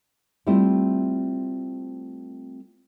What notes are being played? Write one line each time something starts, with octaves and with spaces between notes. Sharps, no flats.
G3 A3 C4 E4 F4